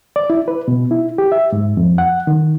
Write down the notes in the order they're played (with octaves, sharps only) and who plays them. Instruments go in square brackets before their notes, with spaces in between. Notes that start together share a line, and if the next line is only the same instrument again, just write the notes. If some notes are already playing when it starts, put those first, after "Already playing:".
[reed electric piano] D5
E4
B4
B2
E4
G4
E5
G#2
F2
F#5
D#3